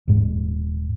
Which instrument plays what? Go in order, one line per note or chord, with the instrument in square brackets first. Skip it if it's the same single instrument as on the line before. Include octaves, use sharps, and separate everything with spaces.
[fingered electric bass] D#1 G#2